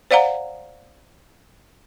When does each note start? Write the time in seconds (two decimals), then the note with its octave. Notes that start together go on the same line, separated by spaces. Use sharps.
0.11 C5 D5 F5 F#5 A#5